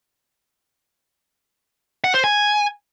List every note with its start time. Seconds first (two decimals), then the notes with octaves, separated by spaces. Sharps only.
2.04 F#5
2.14 C5
2.24 G#5